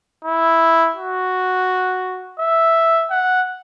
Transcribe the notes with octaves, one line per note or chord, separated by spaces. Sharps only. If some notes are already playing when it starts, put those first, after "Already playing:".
E4
F#4
E5
F#5